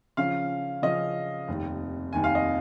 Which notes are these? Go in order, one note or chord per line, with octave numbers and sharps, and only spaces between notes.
C#3 F3 C#4 F5
C#3 F3 C#4 D#5
F1 D#2 D#3
F1 D#2 D#3 G#5
F5
D#5